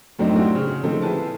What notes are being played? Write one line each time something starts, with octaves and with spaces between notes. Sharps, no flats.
F#2 A2 A3 C4 D4 D#4
A3 C4 C#4 E4 F#4 G4
C#3
A#2 D#3 F3 A3 C4 A4
E4 G#4 B4 A5